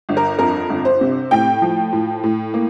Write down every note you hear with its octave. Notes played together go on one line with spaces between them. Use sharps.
G1
A#4
F2 A#4
G1
C5
C3
A2 G5
F3
A2
A2
A#3